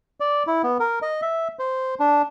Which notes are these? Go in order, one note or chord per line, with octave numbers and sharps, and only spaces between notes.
D5
E4
B3
A#4
D#5
E5
C5
D4